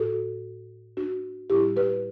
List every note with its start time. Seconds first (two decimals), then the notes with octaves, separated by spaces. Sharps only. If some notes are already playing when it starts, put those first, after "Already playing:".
Already playing: A2 F#4 A4
0.97 D4 F#4
1.50 A2 G3 D4 E4 G4
1.76 G4 B4